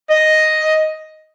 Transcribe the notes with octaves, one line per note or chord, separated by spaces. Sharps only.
D#5